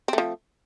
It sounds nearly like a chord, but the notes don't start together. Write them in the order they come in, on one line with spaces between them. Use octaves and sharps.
C4 A3 F3